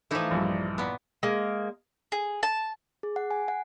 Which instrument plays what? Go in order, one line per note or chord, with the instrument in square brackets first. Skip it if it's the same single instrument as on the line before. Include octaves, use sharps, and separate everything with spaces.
[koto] E3 D#4 E4 [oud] F3 A3
[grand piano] A#1 G2
[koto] A#2 B3
[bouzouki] G#3 A#3
[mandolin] G#4
A5
[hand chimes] G#4
F#5
G#5
F#5